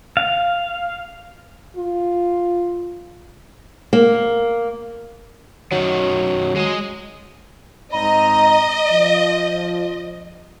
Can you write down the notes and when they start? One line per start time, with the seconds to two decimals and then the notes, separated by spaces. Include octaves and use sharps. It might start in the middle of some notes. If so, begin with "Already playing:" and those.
0.17 F5
1.77 F4
3.93 A#3
5.72 F#2 D#3 F#3
6.56 F#3 G#3 D#5
7.93 G#2 C4 D#5 A#5
8.91 F3